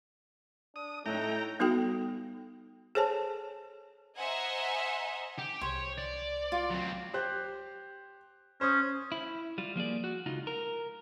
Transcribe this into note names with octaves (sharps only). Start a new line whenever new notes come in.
D4 D#6
A2 D#4 A4 C#5 E5 G5 A#5 F#6
G3 B3 D#4 F#4 A4 G5
G#4 A4 C5 C#5 G#5 A5
C5 D#5 E5 F#5 G#5 A#5
G4
C2 C5 C#5
D5
F4
F#3 C4
G4 C5 F#6
C#4 C5 D#6
E4
G3 F4
F3 A#3 G#4 D5
F#4
C#2 D#4 F4
A#4